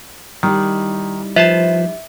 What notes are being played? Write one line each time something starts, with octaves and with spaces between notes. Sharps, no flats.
D#3 G3 D#4 E4
F3 B4 C5 E5 A5